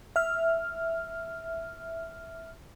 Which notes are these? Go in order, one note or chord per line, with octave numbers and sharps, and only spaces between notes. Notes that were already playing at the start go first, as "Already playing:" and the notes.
E5 F6